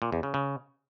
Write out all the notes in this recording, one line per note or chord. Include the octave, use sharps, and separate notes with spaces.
A#2
E2
C#3
C#3